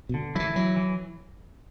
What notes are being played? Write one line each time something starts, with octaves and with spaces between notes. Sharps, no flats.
B2
D3
E3 F#3 E4
E3 F#3
E3